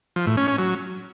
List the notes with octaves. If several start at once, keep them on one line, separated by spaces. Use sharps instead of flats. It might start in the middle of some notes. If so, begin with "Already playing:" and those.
F3
A2
C#4
C#4
F#3